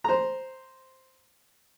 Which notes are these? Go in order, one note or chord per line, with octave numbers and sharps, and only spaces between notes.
C5 A#5